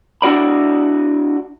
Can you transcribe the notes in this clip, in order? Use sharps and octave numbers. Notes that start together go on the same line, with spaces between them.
D4 E4 F#4 D5 B5